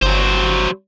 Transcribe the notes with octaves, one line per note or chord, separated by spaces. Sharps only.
G1 F#3 C5